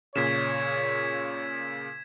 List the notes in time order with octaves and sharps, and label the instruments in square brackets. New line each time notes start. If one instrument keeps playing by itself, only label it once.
[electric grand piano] A#2 C#3 [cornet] C#5 [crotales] G#6 B6 E7